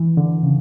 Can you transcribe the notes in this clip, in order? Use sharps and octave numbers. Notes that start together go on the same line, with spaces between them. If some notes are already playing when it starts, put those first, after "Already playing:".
Already playing: E3
D3
C#3